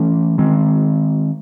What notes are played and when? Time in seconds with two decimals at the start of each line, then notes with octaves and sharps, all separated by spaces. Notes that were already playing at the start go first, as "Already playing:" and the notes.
Already playing: E3 A3 C#4
0.38 D#3 G#3 C4